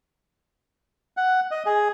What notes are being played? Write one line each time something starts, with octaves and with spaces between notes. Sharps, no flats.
F#5
D#5
G#4